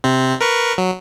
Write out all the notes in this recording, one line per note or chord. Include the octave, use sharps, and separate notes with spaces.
C3 C4
A#4 B4 C#6
F#3